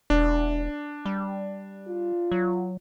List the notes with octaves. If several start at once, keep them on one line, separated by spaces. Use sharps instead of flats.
E1 D4
G3
F4
F#3